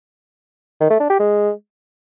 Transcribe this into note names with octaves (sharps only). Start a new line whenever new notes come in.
D#3
A3
D4
G4
G#3